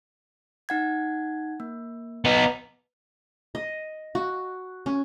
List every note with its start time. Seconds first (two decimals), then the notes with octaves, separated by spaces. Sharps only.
0.69 D#4 F#5 G#6
1.60 A#3
2.25 B3 D#4 B4
3.55 D#5
4.15 F#4
4.86 C#4